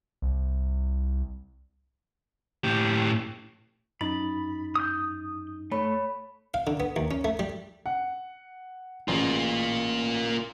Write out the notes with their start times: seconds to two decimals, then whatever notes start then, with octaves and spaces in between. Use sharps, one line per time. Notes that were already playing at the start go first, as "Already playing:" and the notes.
0.22 C2
2.64 A2 G4
4.01 F#2 D#4 B5 A6
4.75 D#6 G6
5.71 A3 C#5 B5
6.54 F5
6.67 D3
6.80 B3
6.96 D#2
7.11 C#4
7.24 A3
7.39 G3
7.86 F#5
9.08 A1 A#3 F4 G#4